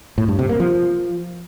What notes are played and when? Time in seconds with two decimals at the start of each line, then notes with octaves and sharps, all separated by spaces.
0.18 A2
0.28 G2
0.39 C3
0.49 A#3
0.60 F3